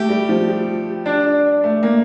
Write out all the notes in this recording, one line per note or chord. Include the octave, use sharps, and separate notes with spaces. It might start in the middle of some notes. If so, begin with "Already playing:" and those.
Already playing: A3 G4
G3
F3
G3
D4
A3
A#3